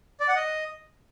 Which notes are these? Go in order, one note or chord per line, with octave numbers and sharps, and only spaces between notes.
D5
F#5
D#5